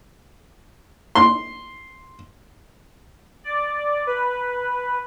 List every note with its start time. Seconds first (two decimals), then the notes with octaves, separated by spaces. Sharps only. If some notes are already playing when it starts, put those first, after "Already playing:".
1.15 C6
3.44 D5
4.07 B4